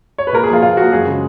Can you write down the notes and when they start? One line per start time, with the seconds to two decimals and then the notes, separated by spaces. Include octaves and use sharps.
0.18 C#5
0.27 B4
0.33 A#2 A#4
0.43 G#4
0.49 F3 A#3 F4
0.62 A#2 F4
0.77 F3 A#3 F#4
0.92 F#2 G#4
1.07 C#3 G#3